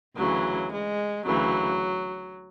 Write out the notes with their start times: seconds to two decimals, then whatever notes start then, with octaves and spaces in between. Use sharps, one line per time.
0.15 D2 C#3 E3 F#3
0.72 G#3
1.26 D2 C#3 E3 F#3